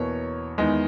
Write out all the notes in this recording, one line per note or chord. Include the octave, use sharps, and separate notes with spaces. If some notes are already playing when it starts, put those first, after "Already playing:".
Already playing: E2 B2 A#3 C#5
E2 D#3 G#3